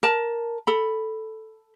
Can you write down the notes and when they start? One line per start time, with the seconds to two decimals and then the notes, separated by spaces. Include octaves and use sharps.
0.03 A#4 A5
0.67 A4 B5